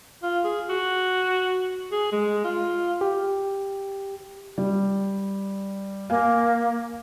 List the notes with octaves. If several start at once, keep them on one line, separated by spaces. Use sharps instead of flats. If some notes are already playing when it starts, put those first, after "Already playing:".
F4
G#4
F#4
G#4
G#3
F4
G4
G3
A#3 F5 G#5